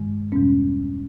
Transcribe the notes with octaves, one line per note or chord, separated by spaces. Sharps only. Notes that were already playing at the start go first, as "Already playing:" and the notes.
Already playing: G2 D#3 G#3
E2 B2 G3 B3 C#4